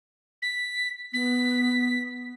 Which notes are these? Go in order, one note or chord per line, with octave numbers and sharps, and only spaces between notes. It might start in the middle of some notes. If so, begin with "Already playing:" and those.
B6
B3 B6